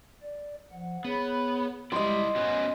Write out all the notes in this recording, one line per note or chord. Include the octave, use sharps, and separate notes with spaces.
D5
F3 F#5
B3 G#4 C#5 B5
G3 G#3 E4 G4 D5 D#5 C6
B3 C#4 F#4 G#5